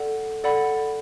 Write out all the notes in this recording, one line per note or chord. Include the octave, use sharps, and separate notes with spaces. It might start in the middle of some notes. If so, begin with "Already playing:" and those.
Already playing: A4 D5 F#5
A4 D5 F#5 B5